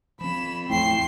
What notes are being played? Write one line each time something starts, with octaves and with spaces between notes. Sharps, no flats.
F3 C4 B5 E7
E2 A2 F3 G5 C6 C7